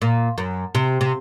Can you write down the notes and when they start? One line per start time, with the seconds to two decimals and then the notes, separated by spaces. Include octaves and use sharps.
0.02 A#2
0.38 F#2
0.75 C3
1.01 C3